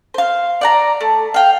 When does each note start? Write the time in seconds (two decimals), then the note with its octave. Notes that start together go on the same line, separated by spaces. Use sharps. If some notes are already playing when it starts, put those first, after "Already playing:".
0.14 C5 F5
0.61 D5 F#5 A#5
1.01 A3
1.34 F5 G5